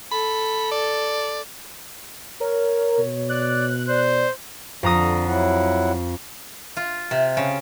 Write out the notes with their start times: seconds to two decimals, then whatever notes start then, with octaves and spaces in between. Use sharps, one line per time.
0.12 A4 B5
0.72 D5
2.40 A#4 C#5
2.99 B2
3.29 D5 F#6
3.89 C5 D5
4.83 F2 D3 A#5 D#6
5.27 F#3 E4 F#5
6.77 F4
7.11 C3
7.37 C#3